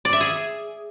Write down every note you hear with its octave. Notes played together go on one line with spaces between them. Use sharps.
D5
E5
G#4